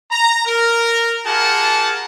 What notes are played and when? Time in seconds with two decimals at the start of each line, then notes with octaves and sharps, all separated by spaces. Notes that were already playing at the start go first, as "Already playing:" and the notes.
0.11 A#5
0.46 A#4
1.26 F4 G4 G#4 A#4 F#5 A5